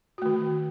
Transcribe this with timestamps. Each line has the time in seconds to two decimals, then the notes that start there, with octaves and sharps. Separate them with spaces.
0.18 F#4
0.22 A3
0.26 D#3